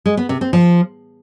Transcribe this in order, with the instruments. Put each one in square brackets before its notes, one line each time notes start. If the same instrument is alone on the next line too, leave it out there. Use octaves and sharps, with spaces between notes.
[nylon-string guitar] G#3
B3
C3
C4
F3